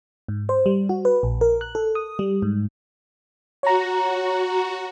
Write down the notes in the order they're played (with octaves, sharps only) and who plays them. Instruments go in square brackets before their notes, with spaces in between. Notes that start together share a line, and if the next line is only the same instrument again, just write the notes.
[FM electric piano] G#2
C5
G3
F#4
B4
A#1
A#4
F#6
A4
D#6
G3
G#2
[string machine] F#4 [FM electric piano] C#5 A#5